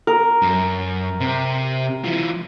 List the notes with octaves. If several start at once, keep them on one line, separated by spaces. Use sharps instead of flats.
A#4
F#2
C3 G4
E3 F4